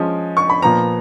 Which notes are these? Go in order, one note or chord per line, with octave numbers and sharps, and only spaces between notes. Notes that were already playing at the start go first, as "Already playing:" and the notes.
Already playing: F3 G#3 C#4
C#6
B5
A#2 F3 B3 A#5